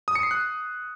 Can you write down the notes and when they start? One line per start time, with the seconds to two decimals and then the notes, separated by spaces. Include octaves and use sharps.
0.08 D#6
0.15 C#7
0.23 C7
0.31 F#6